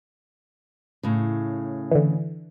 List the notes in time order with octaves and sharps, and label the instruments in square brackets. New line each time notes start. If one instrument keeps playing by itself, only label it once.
[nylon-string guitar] A2 C#3
[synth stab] D3 E3